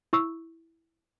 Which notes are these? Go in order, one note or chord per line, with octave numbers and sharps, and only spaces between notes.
E4 C#6 E6